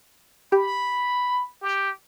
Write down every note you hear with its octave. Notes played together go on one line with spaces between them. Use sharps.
G4 B5
G4